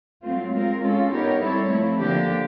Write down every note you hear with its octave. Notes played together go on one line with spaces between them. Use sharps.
F#3 A3 C4 F4
G#3 C4 F4 A#4
G#3 C#4 F4 A4
B3 D#4 G4 A#4 C#5
G3 C4 E4 A4 C#5
F3 A3 C4 E4
D3 F3 A#3 D4 G4